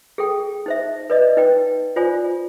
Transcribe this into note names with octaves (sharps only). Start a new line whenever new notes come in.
G#4 A4 G5
D#4 C5 E5
B4 D5 D#5
D#4 B4 G5
F4 C5 D5 G#5